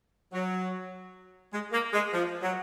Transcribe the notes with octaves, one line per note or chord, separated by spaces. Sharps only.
F#3
G#3
A#3
G#3
F3
F#3